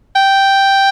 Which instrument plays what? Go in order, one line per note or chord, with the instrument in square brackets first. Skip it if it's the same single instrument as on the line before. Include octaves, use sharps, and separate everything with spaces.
[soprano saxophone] G5